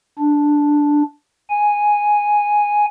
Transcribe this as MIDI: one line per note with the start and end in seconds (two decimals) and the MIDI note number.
0.18 1.02 62
1.50 2.86 80